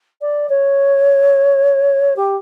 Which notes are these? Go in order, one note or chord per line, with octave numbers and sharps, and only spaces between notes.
D5
C#5
G4